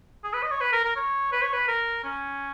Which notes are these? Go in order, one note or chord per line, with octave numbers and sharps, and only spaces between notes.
G#4
B4
D#5
C#5
B4
A#4
A#4
C#5
B4
C#5
B4
A#4
C#4